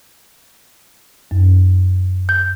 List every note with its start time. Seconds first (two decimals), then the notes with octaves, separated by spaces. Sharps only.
1.31 F#2
2.29 G6